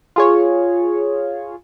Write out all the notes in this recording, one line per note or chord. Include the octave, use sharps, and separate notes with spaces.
F4 G#4 C#5